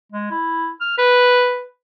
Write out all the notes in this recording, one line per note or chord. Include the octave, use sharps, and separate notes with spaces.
G#3
E4
F6
B4